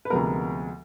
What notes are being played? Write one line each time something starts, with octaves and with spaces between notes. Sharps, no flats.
B4
D2 C3 F3 G#3 B3 A#4